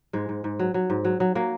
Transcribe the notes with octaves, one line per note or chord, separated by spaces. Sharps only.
G#2 G#3
G#2
G#2
F#3
F#3
G#2
F#3
F#3
F#3 A#3